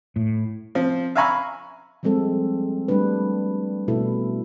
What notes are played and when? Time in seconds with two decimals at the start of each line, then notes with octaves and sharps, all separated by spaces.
0.16 A2
0.75 F3 C4
1.15 E5 F5 G#5 A#5 B5 C#6
2.03 F3 G3 G#3 C4 A4
2.88 G3 A3 D4 B4
3.88 B2 A3 E4 A4